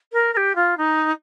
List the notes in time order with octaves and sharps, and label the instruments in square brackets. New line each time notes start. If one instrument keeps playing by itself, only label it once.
[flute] A#4
A#4
G4
F4
D#4